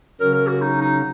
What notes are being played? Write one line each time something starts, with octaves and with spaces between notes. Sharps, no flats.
C#3 F#3 C#4 A#4
A#4
F#4
D#4
D#4